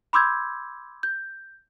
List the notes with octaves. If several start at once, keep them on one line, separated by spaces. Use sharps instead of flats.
B5 C6 D6 E6 G6 G#6
G6